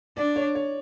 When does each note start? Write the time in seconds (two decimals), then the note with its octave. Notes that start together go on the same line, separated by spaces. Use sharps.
0.17 D4 D5
0.36 C#5
0.55 C#5